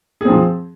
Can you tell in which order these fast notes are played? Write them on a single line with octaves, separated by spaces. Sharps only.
G#4 C4 F3